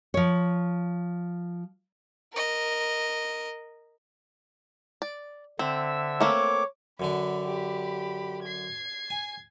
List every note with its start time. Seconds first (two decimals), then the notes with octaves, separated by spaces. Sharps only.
0.14 F3 C#5
2.33 A#4 D#5
5.02 D5
5.59 D3 C4 E5 E6
6.20 A3 A#3 C4 C#5 D6
7.00 F#2 D3 D4 B5
7.45 G4 B5
8.43 G#6 C7
9.10 G#5